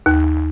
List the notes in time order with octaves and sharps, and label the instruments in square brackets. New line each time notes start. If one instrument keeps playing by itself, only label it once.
[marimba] D#2